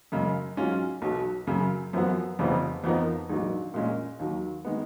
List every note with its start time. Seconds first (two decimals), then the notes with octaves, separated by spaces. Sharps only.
0.12 F#2 C#3 G#3
0.57 G#2 F#3 C#4 F4
1.02 B1 B2 F#3
1.47 F#2 C#3 F#3
1.93 F#2 F3 B3 F#4
2.39 F1 F2 C#3 F3 B3
2.84 F2 F3 B3 D#4 A#4
3.30 A#1 G#2 D#3 F#3
3.74 A#2 G#3 C#4
4.19 D#2 D#3 F#3
4.65 D#3 G#3 B3